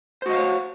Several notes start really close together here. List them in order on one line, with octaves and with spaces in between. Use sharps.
C5 F#4 D#5 F5 C#5